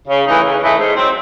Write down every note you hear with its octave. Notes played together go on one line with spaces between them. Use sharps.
C#3
E3 A3 D#4
C#3
E3 A3 D#4
G#2
F#3 C4